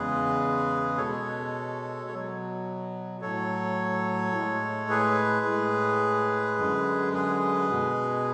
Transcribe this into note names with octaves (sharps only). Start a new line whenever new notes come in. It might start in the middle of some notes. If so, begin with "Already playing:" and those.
Already playing: E2 C#3 G#3 G#4 B4
B2 G#3 A4 C#5
B2 F#3
A2 F#3 A4 C#5
A2 G#3
G#4 B4
A2 G#3
F#2 D3 G#3
G#4 B4
B2 G#3